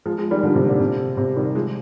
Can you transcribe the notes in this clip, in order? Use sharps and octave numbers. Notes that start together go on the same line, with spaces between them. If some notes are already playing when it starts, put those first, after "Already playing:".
F3 G#3
F3 G#3
D#3 G3
D3 F3
C3 D#3
A#2 D3
C3
C3
D#3 G3
F3 G#3